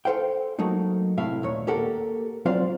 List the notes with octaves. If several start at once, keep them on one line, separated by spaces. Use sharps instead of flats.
A4 A#4 C5 F5 G5
F#3 A3 A#3 D#4
A2 C3 E5 F5
D#2 A#2 C#5
A#3 G4 A4 A#4 F#5
F#3 C4 F4 C5 D5 F5